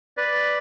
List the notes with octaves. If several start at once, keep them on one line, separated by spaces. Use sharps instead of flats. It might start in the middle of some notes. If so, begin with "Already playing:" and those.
B4 D5